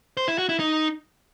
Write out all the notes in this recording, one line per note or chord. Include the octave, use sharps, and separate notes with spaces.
C5
E4
F#4
E4
D#4